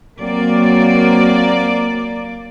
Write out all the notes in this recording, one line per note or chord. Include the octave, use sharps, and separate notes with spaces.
F#3 A#3 C4 D5